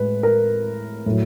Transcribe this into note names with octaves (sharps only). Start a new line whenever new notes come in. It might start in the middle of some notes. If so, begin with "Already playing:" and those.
Already playing: A2 G#3 B4
A#4
A2 F#3